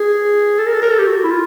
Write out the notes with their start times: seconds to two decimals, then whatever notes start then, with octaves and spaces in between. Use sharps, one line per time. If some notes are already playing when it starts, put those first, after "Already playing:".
Already playing: G#4
0.59 A4
0.66 A#4
0.74 A4
0.82 A#4
0.91 A4
0.99 G4
1.07 F#4
1.24 E4
1.31 F4